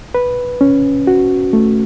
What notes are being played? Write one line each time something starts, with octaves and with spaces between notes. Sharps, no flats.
B4
C#4
F#4
A3